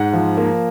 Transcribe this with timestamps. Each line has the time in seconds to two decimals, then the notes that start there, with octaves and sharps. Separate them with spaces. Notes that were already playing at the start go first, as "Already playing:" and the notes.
Already playing: G#2 F#5
0.13 F3
0.38 A#3